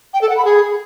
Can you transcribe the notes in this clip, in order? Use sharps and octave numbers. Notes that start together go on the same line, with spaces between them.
G5
A4
F#5
B5
G#4